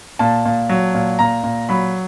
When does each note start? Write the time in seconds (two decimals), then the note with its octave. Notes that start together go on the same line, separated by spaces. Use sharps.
0.19 A#2 A5
0.45 A#2
0.69 F#3
0.95 A#2
1.19 A#2 A#5
1.44 A#2
1.69 F#3 B5